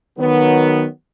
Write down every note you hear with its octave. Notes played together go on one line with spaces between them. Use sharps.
D#3 F#3 B3